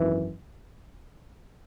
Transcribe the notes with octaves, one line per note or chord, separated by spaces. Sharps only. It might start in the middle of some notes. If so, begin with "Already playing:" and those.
Already playing: G#1 F#2 E3